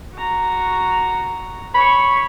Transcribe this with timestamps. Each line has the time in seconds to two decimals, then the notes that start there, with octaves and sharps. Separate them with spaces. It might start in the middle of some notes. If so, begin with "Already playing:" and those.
0.15 F#4 A#5
1.75 C#5 B5 C#6